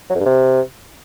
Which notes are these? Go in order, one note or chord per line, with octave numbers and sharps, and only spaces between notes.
F#3
F2
G2
C3